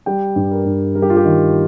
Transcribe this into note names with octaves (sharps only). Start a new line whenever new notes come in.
G3 G5
G2
A#4
G2
G3 A#4
G4
F4
G4
D#3